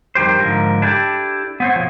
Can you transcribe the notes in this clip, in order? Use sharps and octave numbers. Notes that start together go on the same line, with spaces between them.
F2 D#3 G3 G4 C5
G#2 D3 F3 A#4
D4 E4 G4 A4
B3 C4 C#5
B2 F3